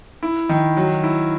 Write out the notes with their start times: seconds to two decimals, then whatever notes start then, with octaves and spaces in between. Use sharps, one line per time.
0.23 E4
0.49 D#3
0.77 F#3
1.04 E4